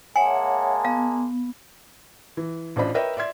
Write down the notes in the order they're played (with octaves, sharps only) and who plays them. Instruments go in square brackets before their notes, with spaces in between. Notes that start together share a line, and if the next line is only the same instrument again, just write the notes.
[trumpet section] G#3 A#3 A5 [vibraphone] C#5 E5 F#5 [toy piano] G#5
[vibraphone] B3 [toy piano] F5
[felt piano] E3
A1 D4 F4 C5 D#5 B5
A#4 B4 C#5 D#5 E5 G5
D5 E5 C6 G#6